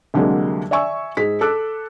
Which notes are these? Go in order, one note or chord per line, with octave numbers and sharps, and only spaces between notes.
C2 D3 F#3 G#3 A#3
D5 E5 G#5 C#6 E6
G#2 G#4 B6
A4 D6 E6 F#6